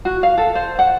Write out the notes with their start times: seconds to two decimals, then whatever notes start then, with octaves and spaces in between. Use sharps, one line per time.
0.05 F#4
0.23 F5
0.38 A4
0.55 C5
0.79 F#5